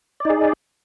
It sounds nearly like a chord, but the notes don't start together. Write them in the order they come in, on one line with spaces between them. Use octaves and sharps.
D5 D#4 G#4